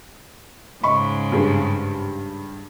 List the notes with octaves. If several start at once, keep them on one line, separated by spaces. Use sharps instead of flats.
G#2 C#3 D#5 B5 C#6
G2 G#4